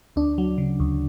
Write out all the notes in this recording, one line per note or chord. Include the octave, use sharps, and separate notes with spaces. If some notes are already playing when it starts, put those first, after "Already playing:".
D2 D4
F#3
C#3
D2